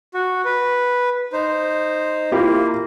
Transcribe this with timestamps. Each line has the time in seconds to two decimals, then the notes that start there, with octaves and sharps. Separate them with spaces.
0.14 F#4
0.45 B4
1.33 D#4 C5
2.32 A#3 E4 F4 G4